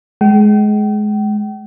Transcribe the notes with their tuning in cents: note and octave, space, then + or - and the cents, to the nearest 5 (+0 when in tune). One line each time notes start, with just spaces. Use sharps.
G#3 +20 G5 -40